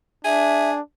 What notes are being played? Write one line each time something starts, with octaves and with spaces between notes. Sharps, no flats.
D4 G#4 E5